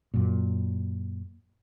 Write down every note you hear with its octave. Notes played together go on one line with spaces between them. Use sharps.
F#2 A#2